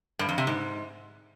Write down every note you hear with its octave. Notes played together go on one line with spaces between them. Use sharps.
G2
F2
C3
G#2